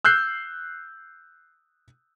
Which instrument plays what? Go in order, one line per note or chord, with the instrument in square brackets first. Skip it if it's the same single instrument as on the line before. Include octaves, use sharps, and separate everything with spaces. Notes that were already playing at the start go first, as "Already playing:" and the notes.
[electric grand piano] E6 F#6 G6 C7